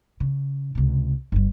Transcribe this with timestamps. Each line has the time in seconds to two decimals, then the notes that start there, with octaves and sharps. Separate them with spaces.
0.20 C#3
0.75 C#2 C3
1.32 G1 G2